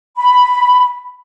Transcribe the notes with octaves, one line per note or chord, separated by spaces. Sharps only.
B5